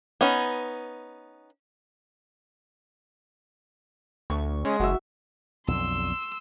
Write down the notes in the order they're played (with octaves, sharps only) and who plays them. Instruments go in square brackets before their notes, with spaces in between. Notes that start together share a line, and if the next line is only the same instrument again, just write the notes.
[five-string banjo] B3 C#4 D#4
[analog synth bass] D2 [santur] C#6
[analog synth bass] C#3 [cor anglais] G#3
[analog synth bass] F#1 [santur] F#4 E5
[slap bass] B1 F2 D3 [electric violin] C6 E6